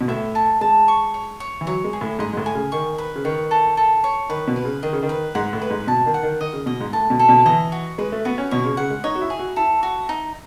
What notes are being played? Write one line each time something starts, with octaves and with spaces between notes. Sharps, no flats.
B2
A2 E5
A5
G#3 A5
C#6
C#5
C#5
E3
F#3 C#5
G#3
G#4
A2
G#2 D#5
G#2
A2
G#5
C#3
D#3 C#6
B4
C#3
D#3 C#5
A4
A4
C#5
D#3 B4
B2
B4
C#3
D#3 D#5
C#3
D#3
B4
G#2 F#5
A2
B4
G#2
B2 A5
D#3
F#5
D#3
D#3 D#5
C#3
B2 D#5
G#2
A2 A5
B2
A4
B2
E3 D#5
F#4
G#3 B4
A3
B3 F#4
C#4
B2 C#5
C#3
C#3 F#5
G#3
D#4 C#5
F#4
E4
G#4
F#4
E4 A4
F#4
D#4